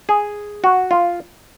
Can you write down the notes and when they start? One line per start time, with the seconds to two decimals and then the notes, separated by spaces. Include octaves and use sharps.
0.09 G#4
0.64 F#4
0.91 F4